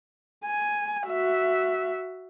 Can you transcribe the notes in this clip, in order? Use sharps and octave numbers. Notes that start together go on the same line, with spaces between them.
G#5
F#4 E5